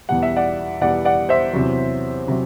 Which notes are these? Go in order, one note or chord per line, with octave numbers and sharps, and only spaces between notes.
E2 B2 G3 F#5
E5
D5 F#5
E2 B2 G3 D5 F#5
D5 F#5
C5 E5
E2 C3 F#3
C3 F#3